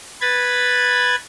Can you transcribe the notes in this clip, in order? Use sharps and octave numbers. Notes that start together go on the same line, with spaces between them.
B4 B5 G#6 A6